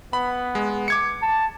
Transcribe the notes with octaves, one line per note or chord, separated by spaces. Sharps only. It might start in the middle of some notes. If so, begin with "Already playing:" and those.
B3 B5
G#3
D6 G#6 C#7
A5